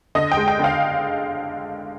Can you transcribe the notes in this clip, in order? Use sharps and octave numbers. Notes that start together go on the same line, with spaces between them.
D3 D#5
G5
G#3
G5
D3 F5